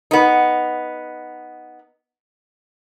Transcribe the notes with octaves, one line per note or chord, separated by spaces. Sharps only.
B3 D#4